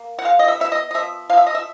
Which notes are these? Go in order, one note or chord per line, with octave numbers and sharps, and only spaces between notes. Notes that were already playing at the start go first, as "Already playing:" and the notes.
Already playing: A#3
F#5
G#3 F5
D#5
E5
B3 E5
D#5
D#5
F3 E5
F3 F5
E5
D#5
E5